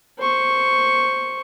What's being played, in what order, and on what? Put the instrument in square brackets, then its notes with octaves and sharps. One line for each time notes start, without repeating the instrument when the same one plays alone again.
[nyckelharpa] C5 C#6